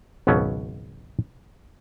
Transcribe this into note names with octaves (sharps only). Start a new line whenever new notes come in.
G#1 C#2 B2 F#3 B3 C#4